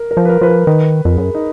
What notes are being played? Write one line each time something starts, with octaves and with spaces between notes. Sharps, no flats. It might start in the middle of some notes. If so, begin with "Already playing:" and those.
Already playing: A#4
A#4
F3
B4
A#4
F3 B4
A#4
D#3 B4
F2 A#4
G#4
F#2 A#4
D#4